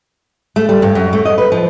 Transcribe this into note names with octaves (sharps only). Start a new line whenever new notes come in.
A3
G3
G2
F#2
A3
D#5
B4
F3